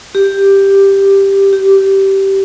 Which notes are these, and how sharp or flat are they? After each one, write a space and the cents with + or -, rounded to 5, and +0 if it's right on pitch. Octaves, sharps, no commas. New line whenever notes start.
G4 +5
G4 -15